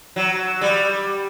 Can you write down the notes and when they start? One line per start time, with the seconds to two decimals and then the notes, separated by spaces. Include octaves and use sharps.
0.16 F#3
0.61 G3